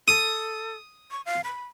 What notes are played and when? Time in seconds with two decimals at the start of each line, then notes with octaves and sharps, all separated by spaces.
0.08 A4 D#6
1.11 C#6
1.26 F5
1.44 B5